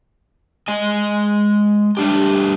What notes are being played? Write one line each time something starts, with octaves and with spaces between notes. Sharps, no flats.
G#3 D#5 G#5
G3 A3 D4 G4